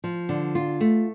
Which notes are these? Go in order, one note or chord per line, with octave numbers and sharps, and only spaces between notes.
F3
D3
F4
A3